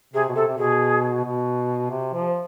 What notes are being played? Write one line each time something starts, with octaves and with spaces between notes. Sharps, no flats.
C3 G#4
B2
C3 A4
C3
B2 G#4
B2
C3
F3